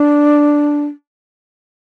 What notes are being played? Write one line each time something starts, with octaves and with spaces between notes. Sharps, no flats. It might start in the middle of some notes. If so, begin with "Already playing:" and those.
Already playing: D4